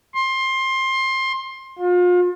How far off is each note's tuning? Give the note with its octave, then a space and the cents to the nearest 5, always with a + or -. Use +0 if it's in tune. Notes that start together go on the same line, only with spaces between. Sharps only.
C6 +20
F4 +35